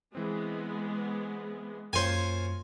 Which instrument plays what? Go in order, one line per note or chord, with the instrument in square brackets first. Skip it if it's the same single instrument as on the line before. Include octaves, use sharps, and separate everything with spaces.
[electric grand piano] E3 C4 [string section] G#3 B3
[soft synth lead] F#2 [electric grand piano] A#3 F4 C#5 [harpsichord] C5 G#5